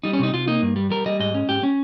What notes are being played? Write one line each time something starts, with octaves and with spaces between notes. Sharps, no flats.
G3 D#4
C#4
C3 D#4
C3 F4
A#3 D#4
G2
G3
G3 A#4
G3 D#5
G#2 D#5
C#4
G#2 G4
C#4